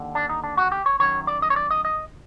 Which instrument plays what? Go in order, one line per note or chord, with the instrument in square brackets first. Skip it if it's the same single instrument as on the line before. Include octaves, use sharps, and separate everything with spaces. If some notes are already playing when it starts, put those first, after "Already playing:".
Already playing: [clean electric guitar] D#2 D3
D4
D#4
D4
F#4
G4
C#5
F#2 D#3 C#5
D5
D#5
C#5
D5
D#5
D#5